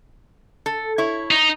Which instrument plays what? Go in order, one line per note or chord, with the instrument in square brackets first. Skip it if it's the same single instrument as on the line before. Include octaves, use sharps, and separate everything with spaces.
[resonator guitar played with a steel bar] A4
E4 C#5
[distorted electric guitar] D#4